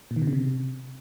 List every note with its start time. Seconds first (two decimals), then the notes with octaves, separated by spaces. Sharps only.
0.11 A#2
0.16 D#3
0.22 B2
0.27 C#3
0.33 C3